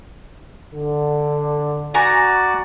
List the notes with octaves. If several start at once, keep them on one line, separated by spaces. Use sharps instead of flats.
D3
F#4 D5 G#5 A#5 C#6